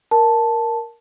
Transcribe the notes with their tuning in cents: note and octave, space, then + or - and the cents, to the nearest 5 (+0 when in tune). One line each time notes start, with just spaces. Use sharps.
A#4 +0 A5 +0